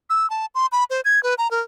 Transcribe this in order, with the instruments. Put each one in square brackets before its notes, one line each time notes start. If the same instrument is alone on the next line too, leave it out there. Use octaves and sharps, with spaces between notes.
[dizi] E6
A5
C6
B5
C5
G#6
B4
A#5
A#4